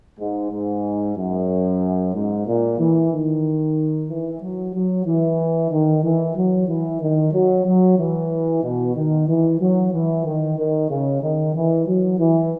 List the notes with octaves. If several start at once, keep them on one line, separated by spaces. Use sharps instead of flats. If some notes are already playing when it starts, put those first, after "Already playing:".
G#2
G#2
F#2
G#2
A#2
E3
D#3
E3
F#3
F#3
E3
D#3
E3
F#3
E3
D#3
F#3
F#3
E3
B2
D#3
E3
F#3
E3
D#3
D#3
C#3
D#3
E3
F#3
E3